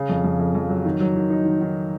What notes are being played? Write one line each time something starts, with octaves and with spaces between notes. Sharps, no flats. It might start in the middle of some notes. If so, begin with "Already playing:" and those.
Already playing: C#3
F2
F2
F2
F2
F#3
D#3
F#3
D#3
D#4
D#3
D#3